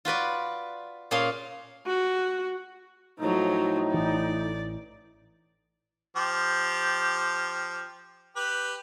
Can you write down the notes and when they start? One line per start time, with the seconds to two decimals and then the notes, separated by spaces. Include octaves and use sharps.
0.05 F4 F#4 B4 D5
1.11 A#2 A#3 C#4 G#4 F5 C6
1.86 F#4
3.20 A2 F3 F#3 D#4
3.94 A1 E3 D5
6.16 F3 G4
8.36 G4 B4